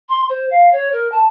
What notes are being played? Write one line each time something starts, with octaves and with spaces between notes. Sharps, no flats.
C6
C5
F5
C#5
A#4
A5